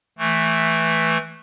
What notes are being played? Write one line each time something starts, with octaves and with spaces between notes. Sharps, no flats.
E3 A3